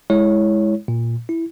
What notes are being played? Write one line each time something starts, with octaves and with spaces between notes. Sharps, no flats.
G#3 E4 C#5
A#2
E4